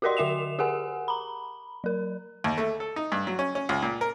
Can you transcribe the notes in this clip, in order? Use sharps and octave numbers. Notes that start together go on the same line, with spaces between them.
F#4 G4 A#4 D5 D#5 C6
D3 F#4 E5 E7 F7
G4 G#4 A#4 F#5 G#5
A#5 B5
F#3 A#4
D#2
A3
A4
D#4
G2
F#3
C#4
C#4
C#2
A#2
A#4